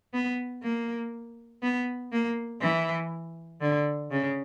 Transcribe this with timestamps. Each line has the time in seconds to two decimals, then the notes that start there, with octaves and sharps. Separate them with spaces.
0.14 B3
0.63 A#3
1.62 B3
2.12 A#3
2.62 E3
3.61 D3
4.11 C#3